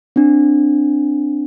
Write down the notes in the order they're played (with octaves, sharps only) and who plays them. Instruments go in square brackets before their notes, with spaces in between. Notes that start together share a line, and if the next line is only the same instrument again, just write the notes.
[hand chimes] C4 D4